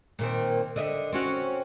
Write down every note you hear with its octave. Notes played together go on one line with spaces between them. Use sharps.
A#2 D#3 C4
D3 D#5 E5
C4 C#4 F#4